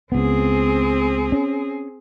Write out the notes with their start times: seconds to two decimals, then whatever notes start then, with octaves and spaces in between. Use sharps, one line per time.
0.12 C#2 B3 C4 G#4
1.32 C#4